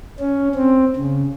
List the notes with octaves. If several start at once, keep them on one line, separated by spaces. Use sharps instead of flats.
C#4
C4
C#3